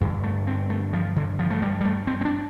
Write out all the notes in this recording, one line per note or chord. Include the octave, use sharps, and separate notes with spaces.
G2 D3 A3
A3
C4
A3
F3
D3
F3
A3
G3
G3
A3
C4
C4
D4